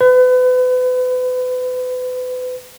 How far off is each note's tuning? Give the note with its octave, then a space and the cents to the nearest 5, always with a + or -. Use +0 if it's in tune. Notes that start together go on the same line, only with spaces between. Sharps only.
B4 +35